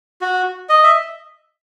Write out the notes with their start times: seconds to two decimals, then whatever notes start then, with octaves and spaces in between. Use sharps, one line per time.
0.21 F#4
0.69 D#5
0.84 E5